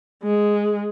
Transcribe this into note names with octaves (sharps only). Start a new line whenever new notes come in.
G#3